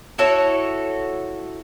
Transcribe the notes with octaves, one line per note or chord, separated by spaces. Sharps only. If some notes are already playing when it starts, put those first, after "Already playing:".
E4 F#4 A4 C#5